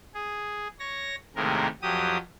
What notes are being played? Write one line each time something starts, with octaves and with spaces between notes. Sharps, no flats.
G#4
C#5 A#6
D#2 A2 C3 G#3 A#4
F2 F#3 G4 D#6